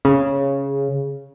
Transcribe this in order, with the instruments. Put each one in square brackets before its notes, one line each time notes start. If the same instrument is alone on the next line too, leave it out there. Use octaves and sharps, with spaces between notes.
[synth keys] C#3